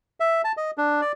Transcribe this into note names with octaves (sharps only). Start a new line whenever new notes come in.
E5
A5
D#5
D4
D5